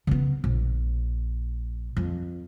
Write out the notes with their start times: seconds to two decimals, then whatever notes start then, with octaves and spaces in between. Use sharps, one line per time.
0.07 C#3 B3
0.44 A#1
1.97 F2